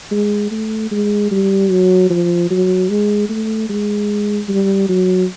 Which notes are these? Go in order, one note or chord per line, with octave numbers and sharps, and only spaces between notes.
G#3
A3
G#3
G3
F#3
F3
F#3
G#3
A3
G#3
G3
F#3